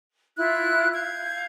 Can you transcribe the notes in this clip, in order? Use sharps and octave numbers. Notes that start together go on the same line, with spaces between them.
E4 F4 E5 F#6
F5 G6 G#6